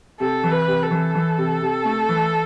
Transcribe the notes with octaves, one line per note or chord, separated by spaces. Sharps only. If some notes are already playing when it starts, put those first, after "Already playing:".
C3 A4
E3
B4
C3
A4
E3
E3
C3
C3
A3
E3